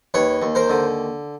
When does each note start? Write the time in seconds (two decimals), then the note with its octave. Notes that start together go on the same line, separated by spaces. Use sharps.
0.14 D#2 B4 C#5
0.42 D#2
0.55 A#4 C5
0.70 D3